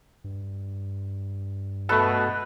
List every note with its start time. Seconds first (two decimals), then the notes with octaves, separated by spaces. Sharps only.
0.24 G2
1.89 B2 A3 A4 B4